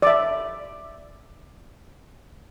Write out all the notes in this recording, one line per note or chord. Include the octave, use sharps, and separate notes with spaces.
D5 E5